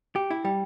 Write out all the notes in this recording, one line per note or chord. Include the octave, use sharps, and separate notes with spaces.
G4 G5
E4
G3 G5